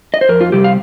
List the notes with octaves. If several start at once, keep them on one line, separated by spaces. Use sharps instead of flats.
D#5
C5
F2 A#4
F4
C3 G3 G4
F5